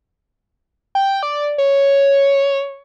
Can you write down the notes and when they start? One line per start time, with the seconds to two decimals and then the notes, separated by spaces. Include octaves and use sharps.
0.95 G5
1.23 D5
1.58 C#5